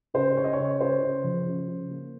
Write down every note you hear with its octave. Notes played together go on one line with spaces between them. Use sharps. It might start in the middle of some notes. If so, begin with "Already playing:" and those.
C#3 C5
C#3 C#5
D#5
C#3 C#5
C#3 C5
C#3
F3
C#3
C#3
A#3